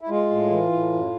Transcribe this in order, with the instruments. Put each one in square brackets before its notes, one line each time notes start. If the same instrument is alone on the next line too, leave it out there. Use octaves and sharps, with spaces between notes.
[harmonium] E4
G#3 F4
A2
E3
A2
F#2